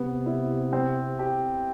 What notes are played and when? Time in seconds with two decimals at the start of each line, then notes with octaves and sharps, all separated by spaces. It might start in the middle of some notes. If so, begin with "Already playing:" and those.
Already playing: C3 B3
0.26 E4
0.73 C4
1.19 G4